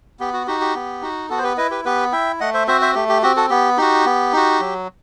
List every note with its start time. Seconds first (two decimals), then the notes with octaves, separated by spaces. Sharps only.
0.20 B3 G4
0.33 F#4
0.47 D#4 F#4 G4
0.61 G4
0.75 B3
1.02 D#4 F#4
1.29 B3 F#4 A4
1.38 C5
1.43 G4 B4
1.57 E4 B4 D#5
1.71 G4 B4
1.85 B3 G4 B4
2.12 E4 E5 G5
2.40 A3 D#5 F#5
2.54 C5 E5
2.67 C4 F#4 C5 E5
2.81 C5 E5
2.95 A3 G4
3.09 G4
3.22 C4 F#4 G4
3.36 F#4 A4
3.50 B3 G4
3.78 D#4 F#4 G4
4.05 B3
4.33 D#4 F#4
4.60 F#3